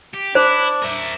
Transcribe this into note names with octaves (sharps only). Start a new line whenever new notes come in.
G4
D4 E4 C5
A#4 E5